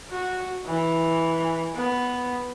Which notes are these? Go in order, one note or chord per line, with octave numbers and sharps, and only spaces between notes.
F#4
E3
B3